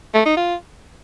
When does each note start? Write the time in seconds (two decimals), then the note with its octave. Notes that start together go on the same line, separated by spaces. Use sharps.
0.14 A3
0.26 D#4
0.37 F4